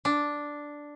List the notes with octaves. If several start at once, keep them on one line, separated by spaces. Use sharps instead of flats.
D4